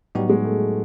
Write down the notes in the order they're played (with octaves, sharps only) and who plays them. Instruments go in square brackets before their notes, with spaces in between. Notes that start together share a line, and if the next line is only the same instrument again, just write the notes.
[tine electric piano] A2 F#3 B3 D#4 F#4 [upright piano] G3
[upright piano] G#3
A3